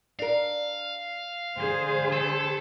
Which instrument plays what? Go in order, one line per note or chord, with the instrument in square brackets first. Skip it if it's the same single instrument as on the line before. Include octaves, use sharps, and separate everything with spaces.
[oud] D4 A#4 [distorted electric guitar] F5
[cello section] D3 G#4 C5
[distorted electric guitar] A4